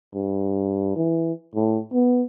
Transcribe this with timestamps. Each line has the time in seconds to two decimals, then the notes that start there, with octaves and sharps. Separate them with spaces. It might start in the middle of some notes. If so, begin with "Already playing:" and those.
0.14 G2
0.96 E3
1.55 A2
1.93 B3